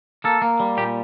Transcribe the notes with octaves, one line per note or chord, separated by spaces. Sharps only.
A#3 A4
A#3
G3
A#2 G4